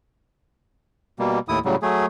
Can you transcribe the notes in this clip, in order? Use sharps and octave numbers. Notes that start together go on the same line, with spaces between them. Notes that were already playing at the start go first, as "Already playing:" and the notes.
B2 G3 A#3
D#2 A2 E4 D#6
A2 C#3 F#3 G3
F#3 A3 G#4